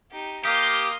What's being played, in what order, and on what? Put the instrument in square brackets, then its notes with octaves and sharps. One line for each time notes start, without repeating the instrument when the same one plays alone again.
[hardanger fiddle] D#4 G4
[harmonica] A#3 D#5 F5 [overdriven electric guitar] G4 [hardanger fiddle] C6 D#6